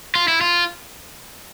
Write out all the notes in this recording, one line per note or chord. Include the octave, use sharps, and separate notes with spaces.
F4
E4
F4